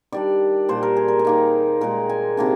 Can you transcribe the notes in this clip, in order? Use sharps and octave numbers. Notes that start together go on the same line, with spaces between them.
D#3 G3 D4 D5
A#2 G3 D4 C5
A#4
G#4
A#4
G#4
D#3 A#3 D#4
A#2 G#3 D#4 A#4
G#5
C3 D#3 A#3 D4